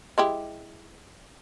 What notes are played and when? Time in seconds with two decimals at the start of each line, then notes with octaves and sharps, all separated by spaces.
0.18 G#3 E4 G4